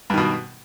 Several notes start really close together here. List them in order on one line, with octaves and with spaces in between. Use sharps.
G2 D#3 B2